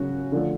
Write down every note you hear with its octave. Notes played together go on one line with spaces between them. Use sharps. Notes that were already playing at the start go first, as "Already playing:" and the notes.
Already playing: C#3 F#3 C#4 F#4
D3 F3 A3